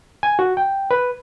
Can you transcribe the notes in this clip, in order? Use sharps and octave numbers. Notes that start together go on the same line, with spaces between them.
G#5
F#4
G5
B4